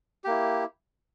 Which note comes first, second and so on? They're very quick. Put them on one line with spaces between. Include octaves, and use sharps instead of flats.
G4 A#3 E4